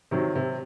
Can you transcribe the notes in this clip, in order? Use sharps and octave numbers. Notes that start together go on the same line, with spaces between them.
C3 D#3 F#3
C3